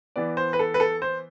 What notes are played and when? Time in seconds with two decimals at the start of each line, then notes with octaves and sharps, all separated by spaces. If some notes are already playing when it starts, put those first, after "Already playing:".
0.16 E3 B3 D5
0.37 C5
0.53 B4
0.59 A4
0.74 B4
0.80 A4
1.02 C5